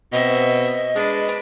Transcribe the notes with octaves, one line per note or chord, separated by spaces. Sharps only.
B2 C4 D#5 E5
G#3 D4 B4